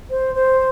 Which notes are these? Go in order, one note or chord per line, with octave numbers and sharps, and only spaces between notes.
C5
C5